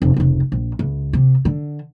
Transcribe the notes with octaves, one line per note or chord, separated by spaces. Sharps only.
F1
F1 C#2
A#1
C#2
C3
D3